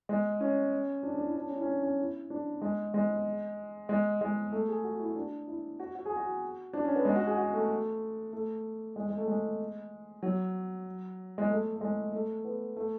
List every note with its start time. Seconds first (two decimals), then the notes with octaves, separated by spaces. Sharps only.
0.09 G#3
0.40 C#4
1.03 D4
1.14 D4
1.25 E4
1.35 D4
1.46 C#4
1.56 E4
1.62 C#4
1.67 D4
1.83 C#4
1.99 E4
2.30 D4
2.62 G#3
2.94 G#3
3.89 G#3
4.21 G#3
4.52 A3
4.68 G#4
4.84 F#4
5.00 E4
5.16 D4
5.47 E4
5.80 F#4
5.95 F#4
6.05 G#4
6.16 F#4
6.73 D4
6.85 C#4
6.96 B3
7.05 G#3
7.16 F#4
7.27 G#4
7.38 F#4
7.53 A3
8.33 A3
8.96 G#3
9.06 G#3
9.17 A3
9.28 G#3
10.23 F#3
11.38 G#3
11.50 A3
11.76 A3
11.81 G#3
12.12 A3
12.45 B3
12.76 A3